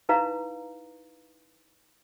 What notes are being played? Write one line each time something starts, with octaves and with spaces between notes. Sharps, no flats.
D#4 E4 B4 F5 A#5